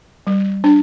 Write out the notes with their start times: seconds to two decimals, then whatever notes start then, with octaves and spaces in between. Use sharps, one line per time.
0.27 G3
0.64 D4